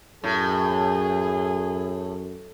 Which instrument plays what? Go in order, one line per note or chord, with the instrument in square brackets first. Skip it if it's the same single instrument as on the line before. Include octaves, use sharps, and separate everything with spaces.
[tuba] F#2 [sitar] A2 [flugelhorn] G#4